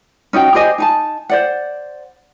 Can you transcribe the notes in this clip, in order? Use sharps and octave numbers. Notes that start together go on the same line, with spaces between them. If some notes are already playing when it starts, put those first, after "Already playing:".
C#4 D#4 F#4 G5
G4 C5 D#5 G#5
D#4 G#5 A5
C5 D5 F#5